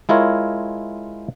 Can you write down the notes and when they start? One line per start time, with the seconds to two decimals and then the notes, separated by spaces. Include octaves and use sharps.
0.09 G#3 E4 F4 A#4 C#5